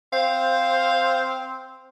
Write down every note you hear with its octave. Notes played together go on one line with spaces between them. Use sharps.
C4 C5 F5